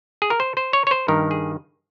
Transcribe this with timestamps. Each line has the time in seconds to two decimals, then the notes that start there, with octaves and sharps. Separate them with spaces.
0.22 G#4
0.30 A#4
0.40 C5
0.57 C5
0.73 C#5
0.87 C#5
0.91 C5
1.08 G2 D#3 A#4
1.31 G#4